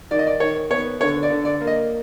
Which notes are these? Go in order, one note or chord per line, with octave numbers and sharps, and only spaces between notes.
D#3 D5
D#5
D5
D#3 C#5
B3 C#5
D3 C#5
D5
D3
D5
A#3
D#5